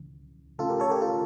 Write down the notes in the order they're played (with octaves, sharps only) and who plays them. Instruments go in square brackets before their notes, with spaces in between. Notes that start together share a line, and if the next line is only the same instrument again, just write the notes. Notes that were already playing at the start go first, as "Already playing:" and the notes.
Already playing: [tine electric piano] C#2 C#3 E3
[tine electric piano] C#3 E3 A3 C#4 [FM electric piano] F4 A4
[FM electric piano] G4 A#4
A4 C#5
G4 A#4
F4 A4